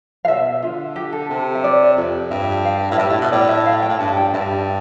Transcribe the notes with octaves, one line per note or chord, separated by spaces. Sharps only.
F5
B2 E5
D3 F4
G4
A4
C3
E5
D5
F2
G2 E5
F5
A2
G2 E5
A2
B2
A2 D5
E5
F5
G5
A2
G2 A5
G5
G2 E5